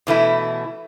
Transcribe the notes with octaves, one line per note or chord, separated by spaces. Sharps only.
B2 E3 A3 E4